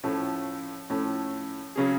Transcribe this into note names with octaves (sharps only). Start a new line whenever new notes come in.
A2 F3 A3 C#4
A2 F3 A3 C#4
C#3 F#3 C#4 G#4